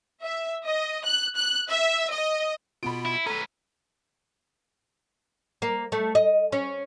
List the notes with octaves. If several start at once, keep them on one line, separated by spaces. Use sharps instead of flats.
E5
D#5
F#6
F#6
E5
D#5
B2 B3 F4 B5 D7
E4
C#4 A4 B4 A#5
A#3
A3
D#5
C#4